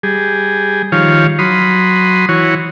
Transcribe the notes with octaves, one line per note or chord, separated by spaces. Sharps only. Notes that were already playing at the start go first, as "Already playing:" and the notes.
G3 G#4
D#3 F3 G3 C#5 F5
F#3 B5 C6 D#6
E3 F#4 C#5